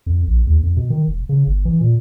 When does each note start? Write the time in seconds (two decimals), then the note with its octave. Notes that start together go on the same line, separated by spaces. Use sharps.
0.06 F2
0.27 A#1
0.47 D#2
0.63 F2
0.77 B2
0.90 D#3
1.08 E1
1.29 C#3
1.46 G1
1.65 E3
1.81 A#2